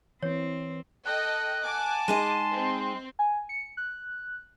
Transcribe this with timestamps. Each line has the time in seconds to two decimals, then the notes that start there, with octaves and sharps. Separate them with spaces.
0.23 E3 C4 C#5
1.06 A4 D#5 G5 F#6
1.64 F#5 G#5 A5 D6
2.08 G#3 D#4 D#5 C6
2.52 C4
3.19 G#5
3.49 C#7
3.77 F#6